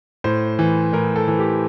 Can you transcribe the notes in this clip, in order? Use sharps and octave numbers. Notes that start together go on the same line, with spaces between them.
A2 C5
E3
A2 A#4
A4
E3
G4